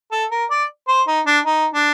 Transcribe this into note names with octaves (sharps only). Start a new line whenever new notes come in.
A4
A#4
D5
C5
D#4
D4
D#4
D4